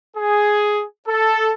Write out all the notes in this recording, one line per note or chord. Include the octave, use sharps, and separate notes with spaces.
G#4
A4